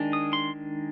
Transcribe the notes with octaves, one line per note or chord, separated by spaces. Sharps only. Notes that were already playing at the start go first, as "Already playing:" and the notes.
Already playing: D#3 G#3 D4
D#6
C6